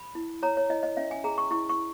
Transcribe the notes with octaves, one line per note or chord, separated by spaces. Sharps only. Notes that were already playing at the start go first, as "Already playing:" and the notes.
Already playing: B5
E4
C#5 A#5
C#5
E4 D#5
D#5
C#4 E5
G#5
G#4 A#5
C#6
E4 C#6
C#6